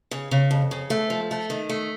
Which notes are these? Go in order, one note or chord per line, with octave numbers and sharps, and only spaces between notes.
C#3
C#3
F2
C#3
A3
F3
A3
D#3
A3